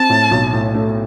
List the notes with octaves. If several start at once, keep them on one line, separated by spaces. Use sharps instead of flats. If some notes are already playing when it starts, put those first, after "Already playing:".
Already playing: C4 A5
A2
B1
A2
A3